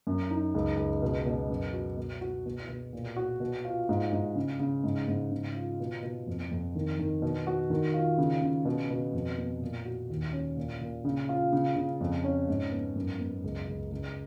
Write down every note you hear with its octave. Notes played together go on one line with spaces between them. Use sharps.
F#2
D#4
C#2
C#2
B2
B2
F#2
F#4
B2
F#4
B2
B2
A#2
F#4
B2
F4
G#2
G#2
C#3
C#3
G#2
G#2
C#3
F4
B2
B2
F2
F2
D#3
D#3
B2
F#4
D#3
F4
C#3
C#3
B2
B2
F2
B3
A#2
F#4
D#2
C#4
A#2
A#2
C#3
F4
C#3
C#3
F2
C#4
G#2
B3
F#2
B3
C#2
C#2
C#2